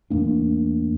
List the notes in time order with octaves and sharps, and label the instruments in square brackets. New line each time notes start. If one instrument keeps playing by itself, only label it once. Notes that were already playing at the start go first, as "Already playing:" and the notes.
[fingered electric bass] E2 A2 A#3 D4